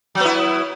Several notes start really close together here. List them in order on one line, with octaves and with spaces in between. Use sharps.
F#3 B3 E4